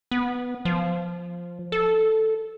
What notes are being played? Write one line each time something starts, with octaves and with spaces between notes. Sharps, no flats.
B3
F3
A4